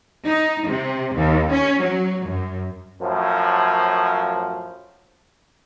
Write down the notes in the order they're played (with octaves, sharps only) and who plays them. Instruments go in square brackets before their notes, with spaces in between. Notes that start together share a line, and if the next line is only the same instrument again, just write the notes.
[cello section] D#4
C3
D#2
C#4
F#3
F#2
[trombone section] F#2 A2 F3